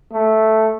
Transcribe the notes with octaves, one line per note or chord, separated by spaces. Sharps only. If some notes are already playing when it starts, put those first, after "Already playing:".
A3